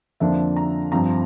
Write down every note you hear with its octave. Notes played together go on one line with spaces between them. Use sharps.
F2 D3 F3 A#3 D4 E5
A#5
G2 F3 C4 A#5